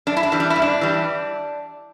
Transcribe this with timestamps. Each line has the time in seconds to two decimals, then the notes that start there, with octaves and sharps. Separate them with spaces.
0.07 F#2 D4
0.17 E4
0.23 D4
0.32 E3 G3
0.40 D4
0.50 E4
0.56 G2
0.62 D4
0.81 E3 G3